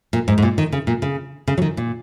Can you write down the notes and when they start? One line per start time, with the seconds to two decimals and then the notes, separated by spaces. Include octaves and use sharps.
0.13 A#2
0.28 G#2
0.38 G#2
0.42 A#2
0.58 D#3
0.72 C#3
0.87 A#2
1.02 C#3
1.48 C#3
1.58 F#3
1.62 D#3
1.77 A#2